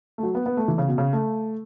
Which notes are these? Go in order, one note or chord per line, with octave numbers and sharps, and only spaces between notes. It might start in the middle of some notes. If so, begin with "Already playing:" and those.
A3
F#3
B3
B3
A3
E3
C#3
B2
C#3
A3